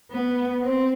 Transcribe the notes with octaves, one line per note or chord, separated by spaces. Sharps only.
B3
C4